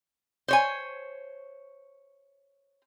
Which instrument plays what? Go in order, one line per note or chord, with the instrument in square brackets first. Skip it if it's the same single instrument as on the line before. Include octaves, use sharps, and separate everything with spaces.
[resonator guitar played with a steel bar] C5 C#5 G#5